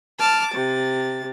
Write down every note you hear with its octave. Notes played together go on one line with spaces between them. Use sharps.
A5 D6 F6
C3 A6